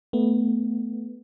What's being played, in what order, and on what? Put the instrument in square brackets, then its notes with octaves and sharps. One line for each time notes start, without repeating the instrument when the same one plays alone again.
[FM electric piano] A3 B3